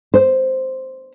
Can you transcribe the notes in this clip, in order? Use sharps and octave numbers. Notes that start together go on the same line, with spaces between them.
C5